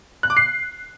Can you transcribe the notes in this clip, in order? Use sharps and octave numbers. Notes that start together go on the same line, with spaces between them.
F#6
D6
C7